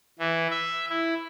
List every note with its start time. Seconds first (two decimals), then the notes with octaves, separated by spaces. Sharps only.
0.19 E3
0.50 E5
0.89 E4